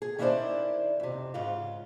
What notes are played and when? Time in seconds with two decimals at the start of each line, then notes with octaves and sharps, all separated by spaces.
0.02 G#4
0.18 D#3 C#4 D4 E4 C5 D5
1.00 F2 C3
1.34 G#2 C#3 F4